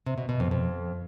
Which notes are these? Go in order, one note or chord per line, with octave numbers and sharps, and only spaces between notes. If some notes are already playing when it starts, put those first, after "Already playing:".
C3
B2
B2
F2
F2